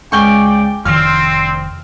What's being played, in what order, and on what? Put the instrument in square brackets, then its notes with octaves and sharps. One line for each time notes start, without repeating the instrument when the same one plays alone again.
[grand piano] C#2 G6 G7 [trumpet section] D5 G5 [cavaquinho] F5 G#5 C#6
[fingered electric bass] F1 D#3 [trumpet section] C4 [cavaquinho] D5 F5 [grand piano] F6